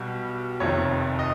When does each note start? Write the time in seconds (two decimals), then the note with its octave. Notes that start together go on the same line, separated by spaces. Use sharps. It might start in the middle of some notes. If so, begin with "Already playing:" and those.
Already playing: B1 B2 G3
0.60 F1 F2 C3 D#3 C#5
1.19 D#5